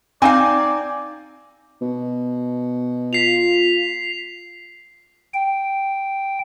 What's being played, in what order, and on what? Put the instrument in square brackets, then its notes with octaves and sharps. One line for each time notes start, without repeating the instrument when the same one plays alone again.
[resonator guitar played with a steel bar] C4 D#4 F5 [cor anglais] D5 [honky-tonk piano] G#5
[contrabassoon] B2
[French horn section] F4 [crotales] B6 C7 F7
[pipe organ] G5